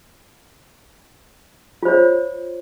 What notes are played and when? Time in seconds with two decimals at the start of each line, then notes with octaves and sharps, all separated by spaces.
1.83 F4
1.85 C5
1.88 C#5